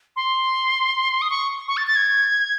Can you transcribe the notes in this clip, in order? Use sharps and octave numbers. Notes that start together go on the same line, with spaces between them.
C6
D#6
C#6
C#6
A6
A6
G#6